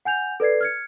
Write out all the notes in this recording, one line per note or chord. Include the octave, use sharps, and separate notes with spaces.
F#5 G#5 G6 F7
A4 B4 D5 G#6 C7
F6 G#6 C#7